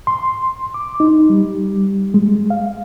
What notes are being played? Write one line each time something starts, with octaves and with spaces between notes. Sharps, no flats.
C6
D6
D#4
G3
G#3
F5